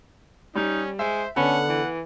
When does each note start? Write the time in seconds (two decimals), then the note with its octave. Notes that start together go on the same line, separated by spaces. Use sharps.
0.55 G3 C#4 D#4
0.99 G#3 C5 E5
1.36 D3 B3 C#4 A4 F#5 B5
1.69 E3